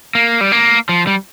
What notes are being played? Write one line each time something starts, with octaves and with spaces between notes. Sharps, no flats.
A#3
G3
A#3
F3
G3